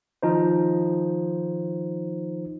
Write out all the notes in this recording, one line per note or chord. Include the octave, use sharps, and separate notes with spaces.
D#3 F3 D#4 C5